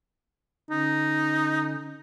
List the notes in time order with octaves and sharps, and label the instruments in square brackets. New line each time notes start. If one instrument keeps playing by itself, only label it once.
[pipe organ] D3 C#4 [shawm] D#4